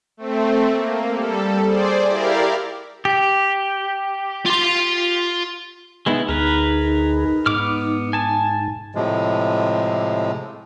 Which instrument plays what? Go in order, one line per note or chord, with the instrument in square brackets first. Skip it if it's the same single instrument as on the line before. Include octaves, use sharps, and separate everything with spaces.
[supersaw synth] A3 C4
A#3
G3 A4
G#4 C5 D5
E4 G4 A#4 D5 F5
[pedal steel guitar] G4
[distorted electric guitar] F4 C6
[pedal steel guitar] G#3 B3 E4 [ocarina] D#4
[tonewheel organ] D2 G#4 [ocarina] D#4 [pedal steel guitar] A#4 B4
[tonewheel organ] G#2 [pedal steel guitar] B3 D6 F6
[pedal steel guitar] G#5 A5
[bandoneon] A2 C3 F3 G#3